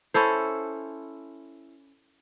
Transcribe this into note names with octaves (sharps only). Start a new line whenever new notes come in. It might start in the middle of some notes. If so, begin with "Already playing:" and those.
C#4 E4 A4 C5